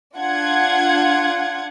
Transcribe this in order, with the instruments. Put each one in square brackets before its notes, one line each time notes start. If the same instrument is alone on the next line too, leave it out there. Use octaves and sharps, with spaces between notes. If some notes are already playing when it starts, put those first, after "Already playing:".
[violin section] D4 F4 F#5 G#6